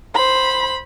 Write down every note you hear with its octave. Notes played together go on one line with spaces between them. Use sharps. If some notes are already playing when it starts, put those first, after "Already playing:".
C5 B5